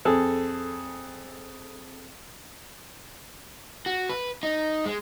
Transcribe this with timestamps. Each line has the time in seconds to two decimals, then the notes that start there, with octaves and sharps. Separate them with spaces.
0.05 F2 G#4 A4
3.86 F#4
4.09 B4
4.43 D#4
4.86 G#3